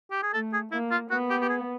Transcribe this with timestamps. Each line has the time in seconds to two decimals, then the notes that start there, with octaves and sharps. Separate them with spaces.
0.11 G4
0.23 G#4
0.33 A3 A4
0.53 G#4
0.72 A#3 E4
0.91 F4
1.10 B3 F#4
1.30 G4
1.41 G4
1.49 G#4